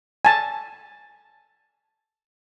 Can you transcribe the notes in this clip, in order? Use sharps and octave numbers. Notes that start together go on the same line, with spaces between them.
G#5 A5